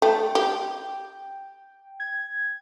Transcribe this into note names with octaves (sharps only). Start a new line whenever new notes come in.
A3 G5
G4
G#6